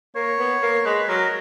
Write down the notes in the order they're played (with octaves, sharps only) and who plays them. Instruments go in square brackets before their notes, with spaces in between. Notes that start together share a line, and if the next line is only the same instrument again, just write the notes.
[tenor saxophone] A#3 [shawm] C#5
[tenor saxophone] B3
A#3
[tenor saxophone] G#3 [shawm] B4
[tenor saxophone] F#3 [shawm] A#4